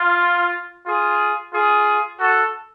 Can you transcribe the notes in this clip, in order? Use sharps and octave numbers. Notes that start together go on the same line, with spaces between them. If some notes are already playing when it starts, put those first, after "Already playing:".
Already playing: F4
F4 G#4
F4 G#4
F#4 A4